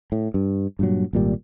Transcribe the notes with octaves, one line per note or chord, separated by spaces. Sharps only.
A2
G2
G2 A#2 F#3
G#1 A#2 G3